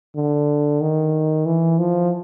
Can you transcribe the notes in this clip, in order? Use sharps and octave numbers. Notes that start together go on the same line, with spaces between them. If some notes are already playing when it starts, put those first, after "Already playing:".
D3
D#3
E3
F3